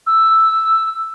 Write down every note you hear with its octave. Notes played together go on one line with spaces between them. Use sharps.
E6